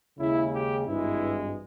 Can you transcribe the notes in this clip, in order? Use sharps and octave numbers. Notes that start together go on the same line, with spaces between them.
D#2 C#3 G#3 E4
G4
G#1 G2 E3 G#3 E4